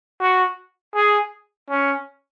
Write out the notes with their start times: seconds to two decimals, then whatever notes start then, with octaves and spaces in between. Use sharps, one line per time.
0.21 F#4
0.95 G#4
1.70 C#4